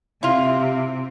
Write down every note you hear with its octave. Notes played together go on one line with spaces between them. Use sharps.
C3 E4 F4